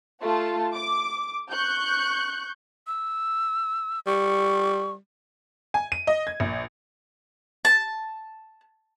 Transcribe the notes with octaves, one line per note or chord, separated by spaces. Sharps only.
A3 F4 A5
D6
C#6 F#6 G6
E6
G3 C#6
G#5
D#7
D#5
G#6
A#1
A5